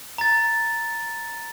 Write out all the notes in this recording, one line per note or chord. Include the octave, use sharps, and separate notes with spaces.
A#5 A6